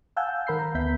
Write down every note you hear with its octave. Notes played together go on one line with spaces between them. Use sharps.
F5 F#5 G#5 A5 E6 G6
D#3 A#4 B5 G6 C7
A#5
D2 B3 E5 G6 B6